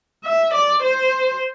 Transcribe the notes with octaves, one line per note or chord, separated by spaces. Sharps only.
E5
D5
C5